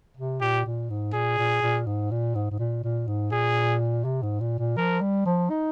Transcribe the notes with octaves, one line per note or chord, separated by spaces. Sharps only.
C3
A#2 G4
A#2
G#2
A#2 G#4
A#2
A#2
G#2
A#2
G#2
G#2
A#2
A#2
G#2
A#2 G#4
C3
G#2
A#2
A#2
F3 A#4
G3
F3
D#4